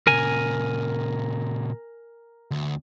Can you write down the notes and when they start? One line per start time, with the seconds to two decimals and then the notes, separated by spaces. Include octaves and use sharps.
0.07 A#2 C#3 A#4 G#5
2.51 D2